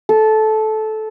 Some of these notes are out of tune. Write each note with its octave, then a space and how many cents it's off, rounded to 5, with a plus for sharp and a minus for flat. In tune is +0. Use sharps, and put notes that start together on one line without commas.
A4 -15